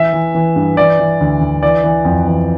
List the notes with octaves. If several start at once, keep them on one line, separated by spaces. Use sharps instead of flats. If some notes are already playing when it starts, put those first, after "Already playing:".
Already playing: E3 E5
E3
E3
G2
E3 D5
E3
D2
D2
E3 D5
E3
F2
E3